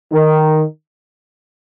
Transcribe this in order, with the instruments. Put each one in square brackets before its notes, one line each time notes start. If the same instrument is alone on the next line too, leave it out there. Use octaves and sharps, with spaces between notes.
[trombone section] D#3